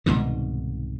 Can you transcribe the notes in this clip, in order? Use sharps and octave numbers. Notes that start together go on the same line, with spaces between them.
C2 G#2 B2 D#3